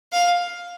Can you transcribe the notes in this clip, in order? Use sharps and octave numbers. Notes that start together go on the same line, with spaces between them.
F5